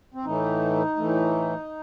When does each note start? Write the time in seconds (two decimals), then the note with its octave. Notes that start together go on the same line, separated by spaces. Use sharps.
0.14 C4
0.25 A2 E3 A3 D#4
0.97 A2 E3 A3